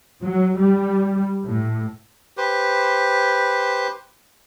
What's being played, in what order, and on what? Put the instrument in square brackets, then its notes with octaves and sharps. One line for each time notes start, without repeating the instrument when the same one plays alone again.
[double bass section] F#3
G3
A2
[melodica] G4 B4 C5